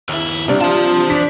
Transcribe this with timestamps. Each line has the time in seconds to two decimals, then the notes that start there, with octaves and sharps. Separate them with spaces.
0.09 D#2 E4
0.48 C2 C3 D4
0.61 F4 C5 A5
1.10 D4 B6